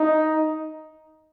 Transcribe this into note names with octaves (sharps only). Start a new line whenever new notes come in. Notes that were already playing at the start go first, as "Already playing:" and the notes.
Already playing: D#4